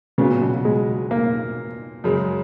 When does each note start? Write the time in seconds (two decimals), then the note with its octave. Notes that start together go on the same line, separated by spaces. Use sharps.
0.18 A#2 C#3 F#3 B3
0.41 B2
0.65 G#3
1.11 A#3
2.04 F#2 C#3 G#3